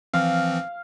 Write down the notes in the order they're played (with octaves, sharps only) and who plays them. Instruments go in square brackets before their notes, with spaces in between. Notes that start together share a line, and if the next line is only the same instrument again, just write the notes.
[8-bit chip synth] E3 F3 C4 [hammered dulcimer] F5